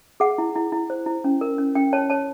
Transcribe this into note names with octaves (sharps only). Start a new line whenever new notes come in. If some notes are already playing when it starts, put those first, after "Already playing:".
G#4 F#5
E4
E4
E4
C5
E4
C#4
A#4
C#4
C#4 G5
C#5 A5
C#5 A5